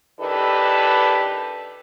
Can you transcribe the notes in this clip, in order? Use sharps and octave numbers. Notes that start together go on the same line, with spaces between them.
D#3 D4 E4 G4 A4 B4